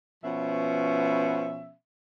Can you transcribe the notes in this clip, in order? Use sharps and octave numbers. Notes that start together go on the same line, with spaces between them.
B2 F3 B3 C#4 E5